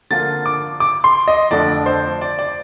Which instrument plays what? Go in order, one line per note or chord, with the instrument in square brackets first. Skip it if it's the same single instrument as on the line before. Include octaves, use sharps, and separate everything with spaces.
[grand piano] D3 F3 A#3 D4 F4 A6
D6
D6
C6
D#5
F2 D3 A3 D4 F4 D5
C5
D5
D5